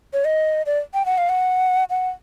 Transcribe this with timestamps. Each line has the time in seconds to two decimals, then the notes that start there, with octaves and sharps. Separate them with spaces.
0.13 C#5
0.25 D#5
0.66 D5
0.94 G5
1.06 F#5
1.18 F5
1.29 F#5
1.90 F#5